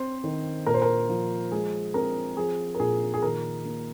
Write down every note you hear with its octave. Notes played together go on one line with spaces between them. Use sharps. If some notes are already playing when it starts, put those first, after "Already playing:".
Already playing: C4 C5
D#3
A#2 A#4
C5
A#4
F3
G#3 G#4
C4 A#4
F3 G#4
A#4
A#2 G#4
G#4
D#3 A#4
A#3